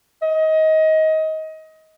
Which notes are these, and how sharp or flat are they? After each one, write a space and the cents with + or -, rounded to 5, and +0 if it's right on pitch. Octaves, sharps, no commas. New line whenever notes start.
D#5 +20